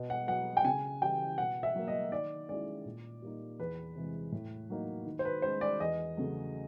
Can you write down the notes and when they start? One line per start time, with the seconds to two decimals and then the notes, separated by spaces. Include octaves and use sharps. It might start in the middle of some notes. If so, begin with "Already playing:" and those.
Already playing: B2
0.10 F#5
0.28 F#3 B3 F#5
0.57 G5
0.65 C#3 G#5
1.01 E3 G3 G5
1.38 B2 F#5
1.63 E5
1.76 F#3 A#3
1.88 D#5
2.12 D#3 D5
2.49 G#3 C#4 E4 D5
2.85 A#2
3.22 G3 A#3 D#4
3.60 E2 B4
3.95 C3 E3 G#3
4.32 A2
4.70 F#3 A#3 D#4
5.06 D#3
5.19 C5
5.25 B4
5.42 G#3 C#4 C5
5.61 D5
5.80 E2 D#5
6.17 C#3 F#3 A3